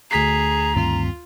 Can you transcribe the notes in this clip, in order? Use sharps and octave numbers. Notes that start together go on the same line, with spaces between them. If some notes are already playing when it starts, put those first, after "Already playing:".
D2 G#4 A#5 B6 C7
G2 D#3 C4 F4